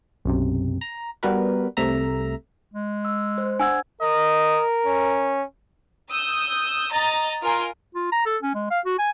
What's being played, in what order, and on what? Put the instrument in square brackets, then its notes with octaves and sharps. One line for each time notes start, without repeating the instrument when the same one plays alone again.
[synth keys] B1 F#2 C3
A#5
G3 B3 F#4 A#4 B4
C2 C3 A3 E5 A#5
[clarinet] G#3
[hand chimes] E6
C5
[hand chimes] D4 F#5 G#6 [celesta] G#5 E6
[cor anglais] A#4 [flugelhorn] D#5
[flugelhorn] C#4
[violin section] D#6 E6 G6
D#5 A#5 A6
F4 A#4 G#5 A#5 C6
[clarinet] F4
A#5
A4
C#4
G#3
F5
F#4
G#5